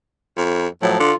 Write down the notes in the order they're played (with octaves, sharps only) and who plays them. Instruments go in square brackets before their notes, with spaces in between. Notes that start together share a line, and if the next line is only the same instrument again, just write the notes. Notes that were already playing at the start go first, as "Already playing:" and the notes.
[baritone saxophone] F2
[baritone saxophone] A2 [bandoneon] F3 F#3
[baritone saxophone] D3 [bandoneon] F4